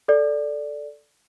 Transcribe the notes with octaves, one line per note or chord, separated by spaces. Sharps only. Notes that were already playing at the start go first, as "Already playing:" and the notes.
A4 D5